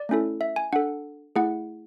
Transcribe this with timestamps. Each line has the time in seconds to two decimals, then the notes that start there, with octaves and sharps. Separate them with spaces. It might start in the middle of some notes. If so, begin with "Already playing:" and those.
Already playing: D5
0.09 A3 C#4 E4 A4
0.41 E5
0.56 G#5
0.73 D4 A4 F#5
1.36 A3 E4 G#4 F#5